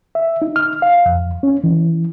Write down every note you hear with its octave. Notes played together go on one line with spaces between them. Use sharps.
E5
D#4
F6
F5
F2
C#4
E3